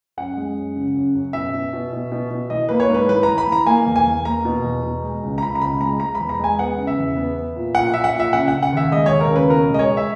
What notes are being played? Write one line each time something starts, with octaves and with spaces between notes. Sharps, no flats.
F#2 F#5
G#3
F#2
C#3
F#2
F#2
B2 E5
B2
B2
B2
B2
B2
E3 D#5
A#3 B4
C#5
G#2 B4
E3 B4
A#5
E3
B5
E3 A#5
A#3 G#5
E2
G#5
E2
A#3 A#5
B2
E2
B2
G#3
C#2
A#5
C#2 B5
A#5
C#2 B5
G#3 A#5
G#3 A#5
E2 B5
A#5
G#3 G#5
B3 F#5
C#3
E5
E2
B3
B3
A#2
A#2 F#5
A#2 E5
F#5
A#2 E5
C#3 F#5
C#3 F#5
F#5
D#2 E5
G#3 D#5
C#5
D#2
A#4
C#3
B4
B2 A#4
G#3 D#5
C#5
G#3
E5